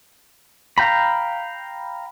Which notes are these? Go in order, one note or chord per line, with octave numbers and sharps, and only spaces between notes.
F5 G5 A#5 B5